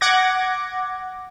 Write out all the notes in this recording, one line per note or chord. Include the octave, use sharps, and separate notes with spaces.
F#5 D6 G#6 A#6